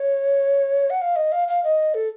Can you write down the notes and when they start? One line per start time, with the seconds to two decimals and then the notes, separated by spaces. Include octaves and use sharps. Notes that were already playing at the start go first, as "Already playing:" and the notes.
Already playing: C#5
0.90 F#5
1.01 F5
1.16 D#5
1.32 F5
1.48 F5
1.64 D#5
1.94 A4